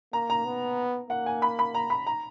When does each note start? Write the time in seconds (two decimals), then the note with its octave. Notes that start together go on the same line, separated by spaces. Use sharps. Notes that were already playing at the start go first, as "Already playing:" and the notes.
0.13 A#3 A#5
0.30 A#5
0.45 B3
1.09 A#3 F#5
1.26 G#5
1.42 B5
1.59 B5
1.74 A#5
1.90 B5
2.07 A#5